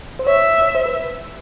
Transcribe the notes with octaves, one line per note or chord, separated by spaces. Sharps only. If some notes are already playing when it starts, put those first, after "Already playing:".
C5
C#5 E5
C#5
C5
B4